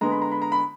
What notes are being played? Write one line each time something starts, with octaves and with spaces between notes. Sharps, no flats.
D3 G#3 B3 A#5
B5
A#5
B5
A#5
B5